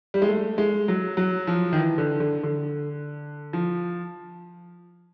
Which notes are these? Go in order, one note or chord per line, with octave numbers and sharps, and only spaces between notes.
G3
G#3
A3
G#3
F#3
F#3
F3
D#3
E3
D3
D3
D3
F3